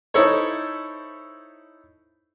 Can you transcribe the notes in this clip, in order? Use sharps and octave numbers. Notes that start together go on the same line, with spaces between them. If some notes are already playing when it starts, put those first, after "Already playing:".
D#4 E4 A4 C5 C#5